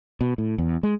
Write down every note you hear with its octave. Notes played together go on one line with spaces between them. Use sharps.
B2
A2
E2
G#3